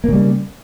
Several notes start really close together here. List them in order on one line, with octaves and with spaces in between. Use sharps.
A#3 C#3 G3